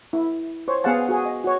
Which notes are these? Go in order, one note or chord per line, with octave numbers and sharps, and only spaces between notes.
E4
C5 C#5
B3 G#4 F5 F#5 A5
F#4 G#4
D#5
F#4 C#5